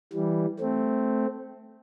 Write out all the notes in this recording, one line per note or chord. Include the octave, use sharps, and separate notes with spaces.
E3 G3
A3 C4